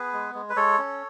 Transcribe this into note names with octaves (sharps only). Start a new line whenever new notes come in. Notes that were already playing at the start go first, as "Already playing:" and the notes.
Already playing: B3 G#4 B4
G#3
G#3
B4
G#3 A4 C#5
C#4